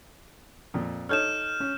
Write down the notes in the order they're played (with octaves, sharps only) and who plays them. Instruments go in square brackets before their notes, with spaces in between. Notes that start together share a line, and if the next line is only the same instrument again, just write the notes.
[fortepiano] F2 A#2
[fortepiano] D#4 A4 C#5 [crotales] F6 G6 E7
[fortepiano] C#4